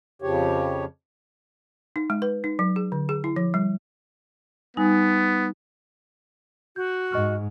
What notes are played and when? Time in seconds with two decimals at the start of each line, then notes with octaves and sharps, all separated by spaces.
0.22 F2 C#3 F3 G4 C#5
1.96 D#4
2.10 G#3
2.22 B4
2.44 D#4
2.59 F#3
2.76 G#4
2.92 D3
3.09 G#4
3.24 E4
3.36 F3
3.54 G3
4.77 G3 B3 D#4 G#5
6.76 F#4 G6
7.12 G#2 D#5 C#6 F6